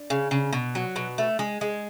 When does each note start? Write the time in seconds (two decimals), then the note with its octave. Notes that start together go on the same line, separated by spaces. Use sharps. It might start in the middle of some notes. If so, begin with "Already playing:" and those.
Already playing: D4
0.10 C#3
0.31 C#3
0.53 B2
0.75 F#3
0.96 B2
1.18 A3
1.39 G#3
1.61 G#3